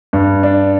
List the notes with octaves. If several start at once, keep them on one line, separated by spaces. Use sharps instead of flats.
G2
D4